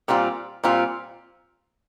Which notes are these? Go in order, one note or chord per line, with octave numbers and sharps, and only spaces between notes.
A#2 G3 C4 F4
A#2 G3 C4 F4